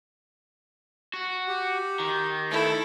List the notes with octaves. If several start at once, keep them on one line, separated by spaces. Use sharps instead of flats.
F#4
G4
D#3
A3 E4 A4